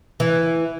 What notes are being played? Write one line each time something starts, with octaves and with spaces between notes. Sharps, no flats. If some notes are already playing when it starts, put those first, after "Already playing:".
E3